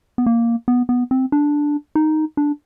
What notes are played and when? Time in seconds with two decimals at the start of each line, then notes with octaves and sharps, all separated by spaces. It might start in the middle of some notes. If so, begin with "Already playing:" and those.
0.18 B3
0.26 A#3
0.68 B3
0.89 B3
1.11 C4
1.32 D4
1.95 D#4
2.37 D4